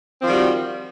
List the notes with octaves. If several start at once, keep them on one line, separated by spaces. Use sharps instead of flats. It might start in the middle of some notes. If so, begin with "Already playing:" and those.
D#3 F3 G3 C4 F#4